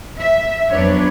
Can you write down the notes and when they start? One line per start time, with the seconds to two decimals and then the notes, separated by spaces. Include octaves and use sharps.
0.16 E5
0.71 F2 F#3 B3 D4 B4 C#5